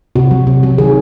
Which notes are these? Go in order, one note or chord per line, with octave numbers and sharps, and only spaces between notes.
C3 F#4
F#3
C3
F#3
D#3 G#4